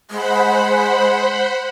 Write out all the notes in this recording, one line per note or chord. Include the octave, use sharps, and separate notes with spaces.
G#3 C5 F#5 B5